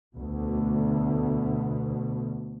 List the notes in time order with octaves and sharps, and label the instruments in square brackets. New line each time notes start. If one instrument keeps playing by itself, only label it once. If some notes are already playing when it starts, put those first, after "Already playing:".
[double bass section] D2 B2